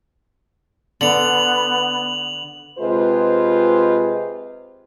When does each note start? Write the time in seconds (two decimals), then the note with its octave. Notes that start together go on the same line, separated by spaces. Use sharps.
1.01 D3 B3 F7 F#7
2.78 C3 G#3 F4 B4 C5